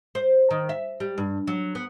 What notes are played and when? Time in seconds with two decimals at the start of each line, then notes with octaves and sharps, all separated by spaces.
0.15 C5
0.51 D#3
0.69 E5
1.00 G3
1.18 G2
1.47 F#3
1.75 B3